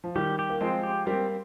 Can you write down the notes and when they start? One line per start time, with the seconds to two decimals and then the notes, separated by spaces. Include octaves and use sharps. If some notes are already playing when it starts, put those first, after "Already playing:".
0.04 F3
0.15 D#3 G3 G4
0.39 G4
0.50 A#3
0.61 F3 G#3 C4
0.83 G4
1.06 G3 A#3 C4